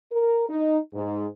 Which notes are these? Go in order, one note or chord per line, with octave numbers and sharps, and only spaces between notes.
A#4
D#4
G#2